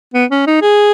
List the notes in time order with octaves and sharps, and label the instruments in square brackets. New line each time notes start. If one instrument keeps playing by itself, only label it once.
[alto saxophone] B3
C#4
D#4
G#4